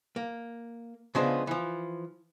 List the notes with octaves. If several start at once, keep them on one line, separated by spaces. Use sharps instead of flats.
A#3
C#3 F3 G#3 B3 D4 C5
E3 F3